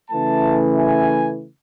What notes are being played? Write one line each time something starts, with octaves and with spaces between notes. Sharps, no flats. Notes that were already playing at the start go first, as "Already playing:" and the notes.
C#3 E3 A3 A5
G#5